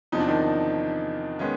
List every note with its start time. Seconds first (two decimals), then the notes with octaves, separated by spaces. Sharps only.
0.12 E2 C3 F3 D#4
0.20 D4
0.28 D#3 D#4
1.39 D#3 G#3 B3 C#4